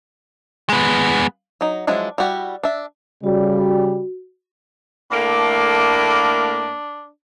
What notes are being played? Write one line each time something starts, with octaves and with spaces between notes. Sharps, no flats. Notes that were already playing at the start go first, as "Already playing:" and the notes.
G#3 B3
F#3 D#4
F3 F#3 G#3 D4 E4
G3 E4 F#4 G4
D4 E5
C#3 G3 F#4
A2 A3 A#3 D4